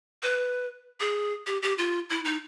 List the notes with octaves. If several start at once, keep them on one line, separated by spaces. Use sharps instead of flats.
B4
G#4
G4
G4
F4
E4
D#4